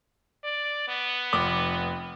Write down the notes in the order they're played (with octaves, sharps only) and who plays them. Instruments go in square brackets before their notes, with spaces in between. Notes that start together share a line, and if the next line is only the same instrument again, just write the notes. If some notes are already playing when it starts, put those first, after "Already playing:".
[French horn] D5
B3
[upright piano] F1 D6